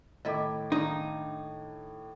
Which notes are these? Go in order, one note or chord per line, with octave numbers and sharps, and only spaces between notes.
A2 D#3 E4 D#5 E5 D6
D#3 A#3 D4 D#4